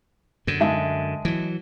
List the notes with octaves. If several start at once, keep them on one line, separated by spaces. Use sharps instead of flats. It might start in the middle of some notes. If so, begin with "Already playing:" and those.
F#2 D3
G#3 E5 A5
E3 F#3